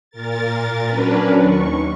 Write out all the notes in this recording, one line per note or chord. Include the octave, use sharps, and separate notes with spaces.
A#2 A#4 A6
F#3 C#4 D4 A#4 B4
D#2 C#6